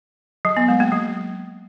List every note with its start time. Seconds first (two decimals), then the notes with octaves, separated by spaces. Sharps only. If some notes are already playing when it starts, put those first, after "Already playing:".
0.45 F#3
0.57 B3
0.68 G#3
0.80 A#3
0.92 F#3